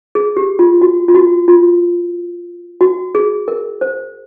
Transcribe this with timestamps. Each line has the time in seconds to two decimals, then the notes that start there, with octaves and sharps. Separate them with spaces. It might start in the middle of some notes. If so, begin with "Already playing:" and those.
0.15 G#4
0.37 G4
0.59 F4
0.82 F#4
1.08 F4
1.15 F#4
1.48 F4
2.81 F#4
3.15 G#4
3.48 A#4
3.81 C5